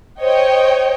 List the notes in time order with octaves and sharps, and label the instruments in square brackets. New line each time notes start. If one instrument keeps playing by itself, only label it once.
[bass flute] C5 [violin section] C#5 D#5 G5